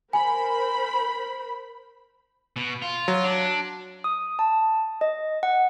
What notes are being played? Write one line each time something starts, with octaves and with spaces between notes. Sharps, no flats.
A#4 C5 G#5 B5
B2
F4
F#3
D4
D#6
A5
D#5
F#5